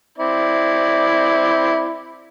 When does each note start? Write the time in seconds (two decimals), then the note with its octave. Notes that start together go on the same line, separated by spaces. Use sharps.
0.18 C4 E4 D5